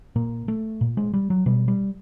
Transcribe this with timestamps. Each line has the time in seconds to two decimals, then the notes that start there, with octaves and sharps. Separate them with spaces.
0.16 A#2 A#3
0.48 A3
0.81 A#2
0.97 G#3
1.14 G3
1.30 F#3
1.46 B2 G3
1.68 G3